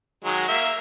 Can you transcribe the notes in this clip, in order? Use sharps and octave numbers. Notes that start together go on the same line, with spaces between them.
D#3 F#3 G#3
A#3 E5